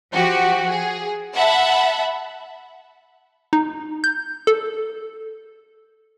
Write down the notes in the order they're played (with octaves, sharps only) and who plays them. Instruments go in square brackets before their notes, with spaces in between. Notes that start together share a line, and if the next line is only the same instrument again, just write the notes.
[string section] F3 F#4 G4
G#4
E5 F#5 A5 B5
[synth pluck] D#4
G6
A4